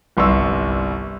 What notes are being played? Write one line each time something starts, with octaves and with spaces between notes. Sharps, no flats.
G1 C2 C6 C#6 E6